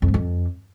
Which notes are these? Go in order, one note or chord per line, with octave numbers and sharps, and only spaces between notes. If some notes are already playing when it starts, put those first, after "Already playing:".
F2
G#2
F2